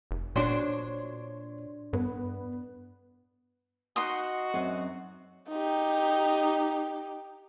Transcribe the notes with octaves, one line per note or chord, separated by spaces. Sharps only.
F1
A#2 D4 F#4 C5 C#5 C6
G2 B3
D#4 F#4 C6 D#6
F#2 C4
D#4 G4